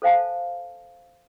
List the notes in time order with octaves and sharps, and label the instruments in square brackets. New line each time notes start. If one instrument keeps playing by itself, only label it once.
[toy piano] A4 C5 F5 G#5 A5